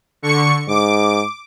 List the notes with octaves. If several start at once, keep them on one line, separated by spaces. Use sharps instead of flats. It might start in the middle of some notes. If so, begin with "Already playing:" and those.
D3 C#6 C#7
G#2 D6